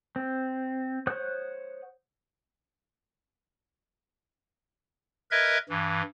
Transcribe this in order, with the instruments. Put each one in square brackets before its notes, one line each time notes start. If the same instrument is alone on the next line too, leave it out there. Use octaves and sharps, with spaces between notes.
[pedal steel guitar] C4
C5 C#5 F#5 D#6 F#6
[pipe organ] A#4 B4 D#5 E5 G#6
G2 E3